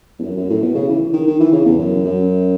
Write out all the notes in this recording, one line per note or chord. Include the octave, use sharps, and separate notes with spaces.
E2
F#2
F#2
A2
B2
C#3
E3
D#3
D#3
E3
C#3
E2
F#2
F#2